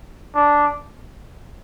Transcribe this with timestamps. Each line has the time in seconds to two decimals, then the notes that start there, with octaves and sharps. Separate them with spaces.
0.35 D4